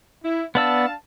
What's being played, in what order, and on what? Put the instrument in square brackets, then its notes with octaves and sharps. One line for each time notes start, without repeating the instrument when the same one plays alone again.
[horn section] E4
[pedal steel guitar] B3 D5 E6 [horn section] D4 F5 A5